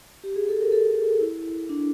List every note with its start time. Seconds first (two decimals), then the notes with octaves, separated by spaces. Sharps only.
0.24 G4
0.36 G#4
0.49 A4
0.61 A#4
0.72 A4
1.21 E4
1.69 D4